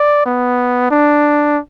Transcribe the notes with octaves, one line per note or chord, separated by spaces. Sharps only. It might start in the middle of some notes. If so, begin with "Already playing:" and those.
Already playing: D5
B3
D4